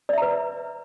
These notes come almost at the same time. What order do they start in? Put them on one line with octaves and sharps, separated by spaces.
D5 E5 A#5 B4